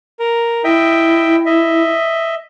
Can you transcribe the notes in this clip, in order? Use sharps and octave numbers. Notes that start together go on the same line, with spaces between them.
A#4
E4 D#5 E5 G5
D#5 E5